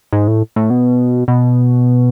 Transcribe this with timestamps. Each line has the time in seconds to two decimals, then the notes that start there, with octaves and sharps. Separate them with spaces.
0.13 G#2
0.28 A2
0.56 A2
0.70 B2
1.28 B2